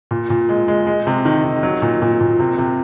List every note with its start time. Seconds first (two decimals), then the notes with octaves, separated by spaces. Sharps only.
0.11 A#2
0.30 A#2
0.49 G#3
0.68 G#3
0.87 G#3
1.07 C3
1.25 D#3
1.44 D#3
1.63 F#3
1.82 A#2
2.02 A#2
2.20 A#2
2.40 C3
2.58 C3